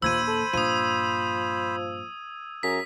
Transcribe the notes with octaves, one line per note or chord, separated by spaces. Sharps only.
A#1 D#2 F3 C5 B5 E6 G#6 D#7
A4
G2 A#2 F3 D#6 D#7
F#2 G#4 A#5 B6